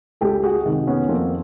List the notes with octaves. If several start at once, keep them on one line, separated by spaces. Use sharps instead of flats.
C#2 G4 A4
F#4 G#4
C3 D#3
B3 C#4
F2 A#3 C4